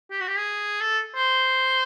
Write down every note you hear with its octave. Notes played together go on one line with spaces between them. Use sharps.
G4
F#4
G4
G#4
A4
C5